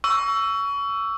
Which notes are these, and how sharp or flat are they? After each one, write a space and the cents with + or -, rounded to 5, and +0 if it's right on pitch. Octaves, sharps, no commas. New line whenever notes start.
C#6 +25 E6 +10